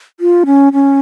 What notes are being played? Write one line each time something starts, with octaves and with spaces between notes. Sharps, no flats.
F4
C#4
C#4